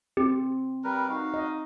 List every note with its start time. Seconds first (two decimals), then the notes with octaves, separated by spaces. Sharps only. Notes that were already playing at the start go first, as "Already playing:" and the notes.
0.17 C4 G4
0.84 G3 A#4 B4
1.09 D#4 F#4 F5
1.34 D#5